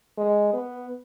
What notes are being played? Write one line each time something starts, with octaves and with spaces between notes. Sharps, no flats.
G#3
B3